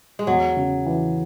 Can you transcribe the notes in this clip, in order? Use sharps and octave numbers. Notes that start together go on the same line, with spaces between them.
G#3
E2 F#3
C#3
E3